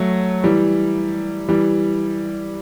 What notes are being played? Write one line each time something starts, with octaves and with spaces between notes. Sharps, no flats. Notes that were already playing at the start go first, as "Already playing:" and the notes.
Already playing: F#3 A3
E3 G3
E3 G3